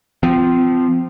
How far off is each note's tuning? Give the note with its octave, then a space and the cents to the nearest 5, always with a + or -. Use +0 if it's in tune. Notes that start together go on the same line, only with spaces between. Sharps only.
F3 -5 C4 -30